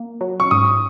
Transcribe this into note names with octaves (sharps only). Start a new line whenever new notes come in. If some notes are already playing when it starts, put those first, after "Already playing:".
Already playing: A#3
F#3
C#6
G#2 D#6